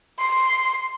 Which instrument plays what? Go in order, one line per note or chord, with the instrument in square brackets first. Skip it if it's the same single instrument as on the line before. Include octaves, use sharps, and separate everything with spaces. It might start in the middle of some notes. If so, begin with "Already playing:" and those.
[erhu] C6